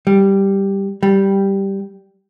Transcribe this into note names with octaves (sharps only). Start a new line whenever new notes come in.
G3
G3